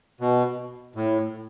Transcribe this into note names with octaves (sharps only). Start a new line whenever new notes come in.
B2
A2